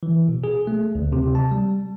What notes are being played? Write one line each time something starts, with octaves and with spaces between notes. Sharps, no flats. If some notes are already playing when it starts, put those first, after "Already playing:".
E3
B2
G#4
A3
D2
C3
A5
G3